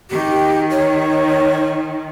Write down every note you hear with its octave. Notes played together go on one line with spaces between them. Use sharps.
D#3 G4
C#5